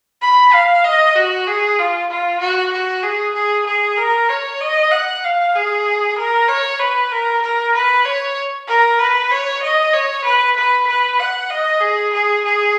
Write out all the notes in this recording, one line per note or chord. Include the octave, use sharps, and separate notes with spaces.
B5
F5
D#5
F#4
G#4
F4
F4
F#4
F#4
G#4
G#4
G#4
A#4
C#5
D#5
F#5
F5
G#4
A#4
C#5
B4
A#4
A#4
B4
C#5
A#4
B4
C#5
D#5
C#5
B4
B4
B4
F#5
D#5
G#4
G#4
G#4